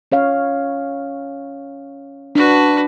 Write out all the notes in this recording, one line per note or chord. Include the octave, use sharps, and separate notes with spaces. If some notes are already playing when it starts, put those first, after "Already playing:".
C#4 C#5 F5
D4 F#4 B4